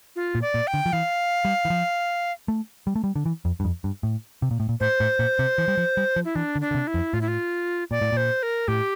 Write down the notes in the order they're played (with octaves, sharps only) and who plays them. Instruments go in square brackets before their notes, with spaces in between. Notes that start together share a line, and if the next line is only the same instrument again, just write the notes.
[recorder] F4
[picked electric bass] A#2
[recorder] D5
[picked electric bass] A#2
[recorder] G5
[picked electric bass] D3
F3
[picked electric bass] E3 [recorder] F5
[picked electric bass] G3
E3
F3
A3
G3
A3
G3
D3
E3
F2
G2
F2
G2
A2
C3
A#2
A2
A#2
[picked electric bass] A2 [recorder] C5
[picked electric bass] A2
A#2
C3
E3
G3
F3
G3
F3
[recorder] E4
[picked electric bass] E3 [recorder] D4
[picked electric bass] D3
[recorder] D4
[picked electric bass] D3
C3
[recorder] E4
[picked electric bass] F2
[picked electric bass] A2 [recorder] F4
[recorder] E4
F4
[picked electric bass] A#2 [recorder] D5
[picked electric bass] A2
[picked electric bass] A#2 [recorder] C5
[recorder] A#4
[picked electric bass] A2 [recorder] G4